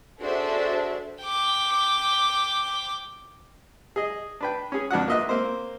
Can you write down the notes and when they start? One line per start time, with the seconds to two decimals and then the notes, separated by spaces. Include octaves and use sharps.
0.20 D4 F#4 G#4 A4 C5 E5
1.24 G5 D6
3.96 G#4 D#5
4.41 D4 B4 G5
4.72 C#4 G#4
4.91 F2 D4 F#4 F#5
5.08 A#3 F4 D#5 E5 F#6
5.29 A#3 C4 C5